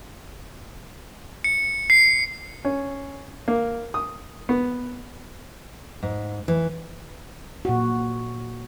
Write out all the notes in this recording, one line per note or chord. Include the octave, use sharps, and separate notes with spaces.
C#7
C7
C#4
A#3
D#6
B3
G#2
E3
A#2 F#4